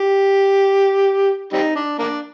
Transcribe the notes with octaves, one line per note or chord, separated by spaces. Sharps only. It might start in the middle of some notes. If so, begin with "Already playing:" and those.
Already playing: G4
G3 C4 D#4
D4
A#3 D4